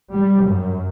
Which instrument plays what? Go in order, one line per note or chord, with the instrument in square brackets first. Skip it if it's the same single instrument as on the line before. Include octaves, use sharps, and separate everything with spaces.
[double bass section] G3
F#2